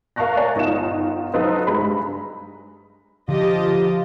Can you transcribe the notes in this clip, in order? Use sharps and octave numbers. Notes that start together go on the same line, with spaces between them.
A#4 F5 A5 C#6 F#6 A#6
A#4 C#5 D5 G#5 A5
G1 D#4 F4 E7
F#3 D#4 F4 A4 B4 C5
G2 G#3 A#5 B5
D3 F3 F4 G4 D#5 A5